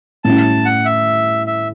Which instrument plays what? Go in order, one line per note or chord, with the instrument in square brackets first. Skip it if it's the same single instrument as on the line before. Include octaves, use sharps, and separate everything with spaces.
[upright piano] A2 G3 C#4 E4 [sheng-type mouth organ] A5
[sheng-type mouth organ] F#5
E5
E5